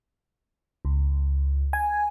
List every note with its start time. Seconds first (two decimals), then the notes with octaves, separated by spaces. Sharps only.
0.85 C#2
1.73 G#5